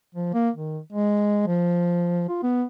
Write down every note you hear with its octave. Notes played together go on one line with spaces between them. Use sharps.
F3
A#3
D#3
G#3
F3
F4
B3